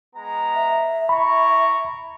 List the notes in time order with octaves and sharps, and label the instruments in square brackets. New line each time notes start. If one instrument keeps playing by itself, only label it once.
[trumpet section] G#3 B3 A#5
[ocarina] E5
[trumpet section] E4 A#5 C#6 [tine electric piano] B5